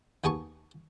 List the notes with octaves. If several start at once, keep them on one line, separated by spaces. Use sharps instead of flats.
D#2 B3 G#4 A5 C#6